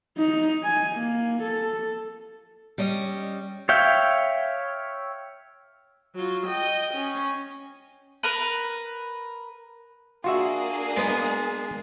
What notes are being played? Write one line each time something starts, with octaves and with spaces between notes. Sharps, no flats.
D#4
G#5
A#3
A4
G3 C#4 D#5
C#5 E5 F5 G5
F#3 F4
D#5 G5
C#4
A#4 B4
A#3 D4 F4 F#4 G#4 E5
G#3 B3